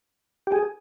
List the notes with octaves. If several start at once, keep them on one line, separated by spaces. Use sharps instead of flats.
G4
G#4